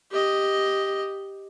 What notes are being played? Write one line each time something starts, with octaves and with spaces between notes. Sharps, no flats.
G4 D#5